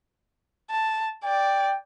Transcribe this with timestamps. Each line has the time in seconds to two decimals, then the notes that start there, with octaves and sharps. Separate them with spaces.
0.71 A5
1.25 D5 G5